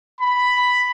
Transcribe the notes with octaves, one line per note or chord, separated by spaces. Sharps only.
B5